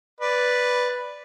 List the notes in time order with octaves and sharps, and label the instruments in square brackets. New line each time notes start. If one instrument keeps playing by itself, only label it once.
[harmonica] B4 D5